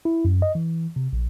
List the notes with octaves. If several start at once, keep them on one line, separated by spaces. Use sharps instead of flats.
E4
F#2
D#5
E3
C3
A#1